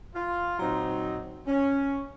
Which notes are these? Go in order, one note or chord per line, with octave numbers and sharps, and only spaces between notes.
F4
A#2 F#3 C4 D#4
C#4